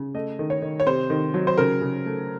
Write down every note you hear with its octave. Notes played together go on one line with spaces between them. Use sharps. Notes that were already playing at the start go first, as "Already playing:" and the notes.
Already playing: C#3
A3 D#5
D#3
C#5
D#3
C#5
C3 C5
D#3
F#3
C5
C#3 A#4
C#3
A3